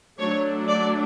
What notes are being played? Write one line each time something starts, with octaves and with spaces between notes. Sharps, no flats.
F#3 A3 D4 C#5
D5